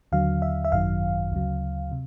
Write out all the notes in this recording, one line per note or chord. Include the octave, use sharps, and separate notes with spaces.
D#2 D3 F#3 F5
E5
E5
G#1 F#2 D#3 F#3 F5
D2 C#3 F#3
C3